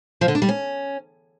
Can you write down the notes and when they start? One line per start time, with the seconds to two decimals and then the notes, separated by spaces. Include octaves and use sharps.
0.21 F3
0.28 D3
0.35 D4
0.42 G3
0.49 C#4